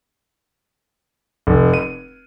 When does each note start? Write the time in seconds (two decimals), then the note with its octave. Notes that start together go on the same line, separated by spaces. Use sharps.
1.47 F1
1.74 D#7